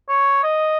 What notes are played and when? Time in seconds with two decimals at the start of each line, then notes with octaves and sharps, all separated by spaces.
0.09 C#5
0.43 D#5